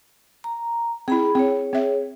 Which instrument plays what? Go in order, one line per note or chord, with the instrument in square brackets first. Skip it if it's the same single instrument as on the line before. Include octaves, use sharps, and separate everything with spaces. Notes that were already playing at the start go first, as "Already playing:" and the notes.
[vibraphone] A#5
[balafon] C4 E4 [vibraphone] G#4 B5
[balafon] C4 [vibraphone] G#4 C#5
[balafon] C4 E5